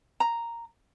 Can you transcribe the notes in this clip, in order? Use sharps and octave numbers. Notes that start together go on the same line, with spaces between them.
A#5